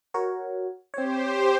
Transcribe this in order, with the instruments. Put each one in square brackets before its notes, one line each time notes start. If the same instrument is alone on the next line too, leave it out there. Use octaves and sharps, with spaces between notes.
[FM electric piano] F#4 A#4 C#5
[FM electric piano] C4 C#5 [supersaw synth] G4 C5